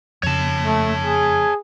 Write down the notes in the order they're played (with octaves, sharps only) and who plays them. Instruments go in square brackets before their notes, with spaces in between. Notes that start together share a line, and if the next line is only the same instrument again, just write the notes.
[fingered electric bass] F2 C#3 [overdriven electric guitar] C#5 A5
[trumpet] A3
G#4